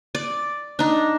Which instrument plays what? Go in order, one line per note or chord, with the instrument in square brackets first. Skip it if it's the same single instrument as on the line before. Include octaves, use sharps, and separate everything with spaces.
[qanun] D5
D4 D#4